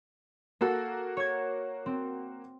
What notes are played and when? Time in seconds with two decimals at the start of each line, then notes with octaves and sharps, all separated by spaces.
0.61 A#3 F#4 A4
1.17 C#5 G#6
1.86 C4